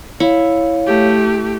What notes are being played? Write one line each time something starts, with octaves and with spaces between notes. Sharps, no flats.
E4 C#5 F5
A3 G4